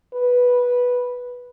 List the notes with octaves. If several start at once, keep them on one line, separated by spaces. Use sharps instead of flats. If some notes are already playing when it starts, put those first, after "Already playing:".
B4